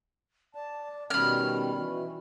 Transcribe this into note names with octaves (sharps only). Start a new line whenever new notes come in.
D5 A5
B2 D#3 G3 C#4 B5 F6
E3 F#4